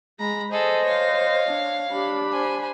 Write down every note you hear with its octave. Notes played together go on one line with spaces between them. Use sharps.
G#3 A#5 B5
G#4 A4 C5 D#5
C#5 F5
D4
D4 G4 B5
C5 G#5